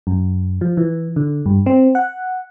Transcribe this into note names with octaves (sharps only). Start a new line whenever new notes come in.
F#2
F3
E3
D3
G2
C4
F#5